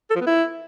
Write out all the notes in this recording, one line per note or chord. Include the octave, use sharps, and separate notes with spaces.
A4
F3
B3
E4